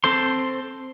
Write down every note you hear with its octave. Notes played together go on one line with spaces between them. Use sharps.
C4 A4 C5 C6